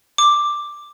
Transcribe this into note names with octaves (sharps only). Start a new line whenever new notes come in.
D6